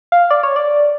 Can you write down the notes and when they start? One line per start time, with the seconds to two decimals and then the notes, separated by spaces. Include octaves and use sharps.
0.12 F5
0.31 D5
0.43 C#5
0.56 D5